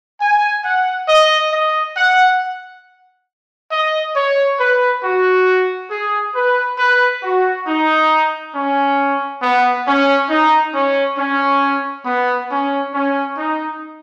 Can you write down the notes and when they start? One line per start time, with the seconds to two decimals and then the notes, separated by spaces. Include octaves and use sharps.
0.21 G#5
0.65 F#5
1.09 D#5
1.53 D#5
1.96 F#5
3.72 D#5
4.17 C#5
4.60 B4
5.04 F#4
5.91 G#4
6.36 B4
6.79 B4
7.23 F#4
7.68 D#4
8.55 C#4
9.43 B3
9.87 C#4
10.30 D#4
10.75 C#4
11.18 C#4
12.06 B3
12.51 C#4
12.94 C#4
13.38 D#4